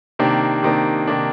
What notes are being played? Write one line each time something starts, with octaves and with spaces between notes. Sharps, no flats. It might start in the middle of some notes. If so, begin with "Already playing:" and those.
C3 D#3 A#3 D4
C3 D#3 A#3 D4
C3 D#3 A#3 D4